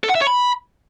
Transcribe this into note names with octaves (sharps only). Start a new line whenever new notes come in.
A4
F#5
E5
C#5
B5